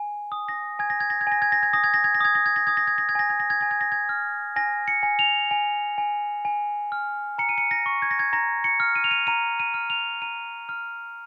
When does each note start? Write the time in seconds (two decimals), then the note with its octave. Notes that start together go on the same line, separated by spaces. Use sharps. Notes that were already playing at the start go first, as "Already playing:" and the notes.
Already playing: G#5
0.32 D#6
0.48 A#6
0.79 G#5 G#6
0.90 A#6
1.00 G#6
1.10 A#6
1.21 G#6
1.27 G#5 A#6
1.42 G#6
1.52 A#6
1.63 G#6
1.73 D#6 A#6
1.84 G#6
1.94 A#6
2.04 G#6
2.15 A#6
2.21 D#6 G#6
2.35 A#6
2.46 G#6
2.56 A#6
2.67 D#6 G#6
2.77 A#6
2.87 G#6
2.98 A#6
3.09 G#6
3.15 G#5 A#6
3.30 G#6
3.40 A#6
3.50 G#6
3.61 G#5 A#6
3.71 G#6
3.81 A#6
3.92 G#6
4.09 F6
4.56 G#5 A#6
4.88 C#7
5.03 G#5
5.19 F7
5.51 G#5
5.98 G#5
6.45 G#5
6.92 F6
7.38 A#5 C#7
7.49 D#7
7.58 C#7
7.71 A#6
7.86 C#6
8.02 G#6
8.11 A#6
8.19 G#6
8.33 A#5 A#6
8.64 C#7
8.80 F6
8.95 D#7
9.04 F7
9.11 D#7
9.27 A#5 D#7
9.60 D#7
9.74 F6
9.90 F7
10.22 A#5 D#7
10.69 F6